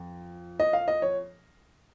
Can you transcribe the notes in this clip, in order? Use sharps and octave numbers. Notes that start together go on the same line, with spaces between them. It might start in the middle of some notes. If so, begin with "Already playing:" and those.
Already playing: F2
D#5
F5
D#5
C#5